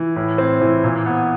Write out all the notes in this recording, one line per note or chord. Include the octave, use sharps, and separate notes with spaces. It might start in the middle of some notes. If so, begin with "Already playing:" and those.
Already playing: E3
A2
C4
E3
A#2
B3